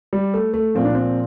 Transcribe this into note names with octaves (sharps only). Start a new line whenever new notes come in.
G3
A3
A3
A#2 F3 C4
D4
C4